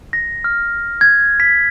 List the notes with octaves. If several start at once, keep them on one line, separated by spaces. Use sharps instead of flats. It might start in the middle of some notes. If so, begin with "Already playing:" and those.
A#6
F6
G#6
B6